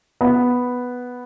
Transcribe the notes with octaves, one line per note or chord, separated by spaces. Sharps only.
B3